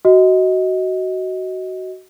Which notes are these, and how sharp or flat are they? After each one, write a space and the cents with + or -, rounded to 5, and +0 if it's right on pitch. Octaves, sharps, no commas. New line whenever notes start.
F#4 +15 D#5 +20